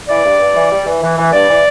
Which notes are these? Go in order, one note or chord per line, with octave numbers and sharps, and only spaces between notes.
E3 D5
G2
G2
E3
G3
E3
E3
E3
G2 D5
E3